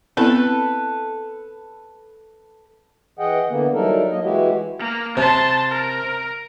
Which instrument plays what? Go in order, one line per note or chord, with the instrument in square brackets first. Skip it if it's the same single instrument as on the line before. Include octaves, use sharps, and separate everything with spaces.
[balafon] B3 C4 E4 [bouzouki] A4 B4
[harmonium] E3 G#4 D#5 F#5 G5
D3 E3 A#3 B3
F#3 G3 D#4 E4 A4 A#4
F#3 A#3 D#5
E3 G#3 E4 F#4 G4
[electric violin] A#3
[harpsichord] C3 [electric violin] A5 C6
[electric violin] A#4